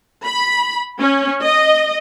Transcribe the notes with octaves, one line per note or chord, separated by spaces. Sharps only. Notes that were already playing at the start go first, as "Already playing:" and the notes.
B5
C#4
D#5